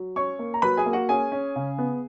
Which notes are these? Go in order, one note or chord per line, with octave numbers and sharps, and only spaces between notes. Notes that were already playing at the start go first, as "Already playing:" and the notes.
Already playing: F#3
C#4 C#5 C#6
A#3
A#5
F#3 B4 B5
G#4 G#5
A#3
F#4 F#5
C#4 G#4 G#5
C#4
C#3
B3